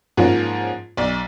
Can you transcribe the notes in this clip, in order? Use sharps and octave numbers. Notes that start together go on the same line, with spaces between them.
G#2 F3 A#3 C#4
B1 D5